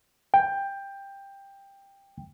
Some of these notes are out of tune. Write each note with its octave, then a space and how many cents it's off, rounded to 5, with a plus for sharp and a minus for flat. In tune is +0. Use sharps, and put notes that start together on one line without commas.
G5 +15